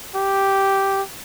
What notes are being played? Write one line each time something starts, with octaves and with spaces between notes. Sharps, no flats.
G4